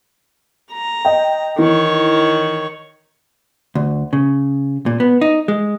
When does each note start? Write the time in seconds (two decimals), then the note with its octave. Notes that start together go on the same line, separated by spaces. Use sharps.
0.72 A#5
1.05 D#5 G5
1.58 D#3 E3 C#5
3.75 D2
4.13 C#3
4.86 A#2
5.00 B3
5.21 D#4
5.48 G#3